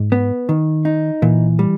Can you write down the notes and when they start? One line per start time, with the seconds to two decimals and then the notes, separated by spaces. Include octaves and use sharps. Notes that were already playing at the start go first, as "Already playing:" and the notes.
Already playing: G#2
0.12 B3
0.49 D#3
0.85 D#4
1.22 A#2 E3
1.59 G3